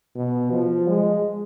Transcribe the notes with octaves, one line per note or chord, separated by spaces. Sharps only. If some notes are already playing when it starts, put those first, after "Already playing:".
B2
F3
G#3